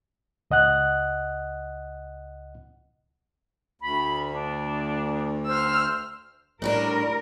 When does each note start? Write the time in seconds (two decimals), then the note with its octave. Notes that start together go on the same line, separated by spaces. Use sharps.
0.51 C#2 D#5 F#5 F#6
3.82 D2 B5
4.32 D4
5.47 C5 E6 F6
6.62 A2 G3 D4 A#4